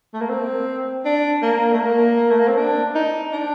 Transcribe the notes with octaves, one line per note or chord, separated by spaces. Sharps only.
A3
A#3
C4
D4
A#3
A3
A#3
A3
A#3
C4
D4
D#4
D4